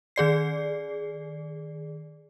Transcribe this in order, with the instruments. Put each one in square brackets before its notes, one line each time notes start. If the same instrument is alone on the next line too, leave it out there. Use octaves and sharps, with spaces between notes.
[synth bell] D#3 G#4 D5 C7